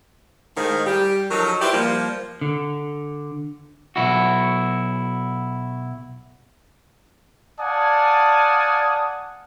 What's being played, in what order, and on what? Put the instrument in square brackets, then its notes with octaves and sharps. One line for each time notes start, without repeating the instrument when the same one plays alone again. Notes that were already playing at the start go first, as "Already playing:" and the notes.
[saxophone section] A2 D#3 G#3 G#4 C5 F5
G3 G4
F3 F#3 D#4 A4 A#4
E4 G4 B4 C5 D5
F3 G3 A#3
[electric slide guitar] D3
[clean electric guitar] B1 E4 F#4
[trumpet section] D5 F5 F#5 G#5 A5 D#6